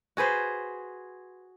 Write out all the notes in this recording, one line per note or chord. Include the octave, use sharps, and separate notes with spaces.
F#4 G#4 B4 C5